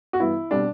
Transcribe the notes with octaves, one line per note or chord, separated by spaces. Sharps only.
F#4
G2 E3 B3 E4
B2 G3 C4 D4